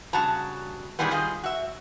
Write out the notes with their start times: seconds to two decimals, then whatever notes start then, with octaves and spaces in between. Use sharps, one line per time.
0.13 G2 C#3 F#4 A5 A#5
0.99 A#2 D#3 E3 G3 G#3 B3
1.11 D#3 G3 F4 G#4 D#5
1.44 F#4 E5